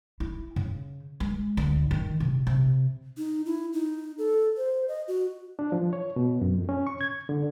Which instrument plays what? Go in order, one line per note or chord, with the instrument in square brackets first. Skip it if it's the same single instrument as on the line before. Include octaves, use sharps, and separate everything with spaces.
[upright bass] E4
C#3
G#3
D2
D#3
C3
C3
[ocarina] D#4
E4
D#4
A4
C5
D#5
F#4
[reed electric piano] D4
F3
C#5
B2
F#2
F2
C#4
C#6
G#6
D3